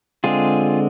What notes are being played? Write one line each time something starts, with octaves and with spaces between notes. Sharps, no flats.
D3 G#3 C4 F4 G#4